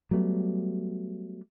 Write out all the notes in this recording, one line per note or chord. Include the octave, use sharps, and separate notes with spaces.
F#3 G3 A3 B3